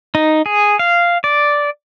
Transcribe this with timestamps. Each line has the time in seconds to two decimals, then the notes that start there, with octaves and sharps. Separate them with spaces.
0.15 D#4
0.46 G#4
0.79 F5
1.24 D5